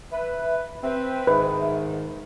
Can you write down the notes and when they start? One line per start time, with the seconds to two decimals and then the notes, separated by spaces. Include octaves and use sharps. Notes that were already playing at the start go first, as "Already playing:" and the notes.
0.12 B4 E5
0.83 C4 B4 E5
1.27 G#2 D#3 B4